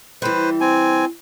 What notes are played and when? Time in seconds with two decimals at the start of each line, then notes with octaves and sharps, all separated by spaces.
0.22 E3 G3 B4 C5
0.61 C4 G#5